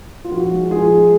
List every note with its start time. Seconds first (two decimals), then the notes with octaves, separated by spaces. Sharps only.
0.25 F4
0.32 F3 F#4
0.51 G#3
0.71 F3 F4 G#4
0.90 G#3